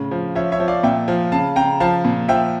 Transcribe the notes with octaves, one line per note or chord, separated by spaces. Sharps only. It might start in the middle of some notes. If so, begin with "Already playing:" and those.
Already playing: A2 C#3
F3
F3 C#5 E5
C#5 E5
F3
D5 F5
A#2 E5 G5
F3
C#3 F5 A5
C#3 G5 A#5
F3 F5 A5
A#2
F3 E5 G5